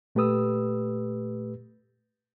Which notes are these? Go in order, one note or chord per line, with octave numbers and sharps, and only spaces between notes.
A#2 A3 G4 B4 D#6 E6